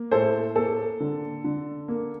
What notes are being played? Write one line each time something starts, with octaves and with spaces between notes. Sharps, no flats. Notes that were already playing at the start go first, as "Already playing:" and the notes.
Already playing: A#3
A2 A4 C5
A#3 A4
D3
D3
A#3